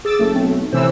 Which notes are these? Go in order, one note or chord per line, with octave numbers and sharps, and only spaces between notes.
G#4 D6 E6 A6
F#1 A3
B1 C4
A2 C3 E3 C5 E6